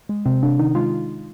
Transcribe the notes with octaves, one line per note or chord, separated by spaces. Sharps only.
G#3
C3 C4
C3 D4
D#3 D#4
G#3 F4